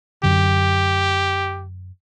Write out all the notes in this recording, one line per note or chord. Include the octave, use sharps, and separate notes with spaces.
F#2 D3 G4